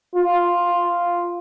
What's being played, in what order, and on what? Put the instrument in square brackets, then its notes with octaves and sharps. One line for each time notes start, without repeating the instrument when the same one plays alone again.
[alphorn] F4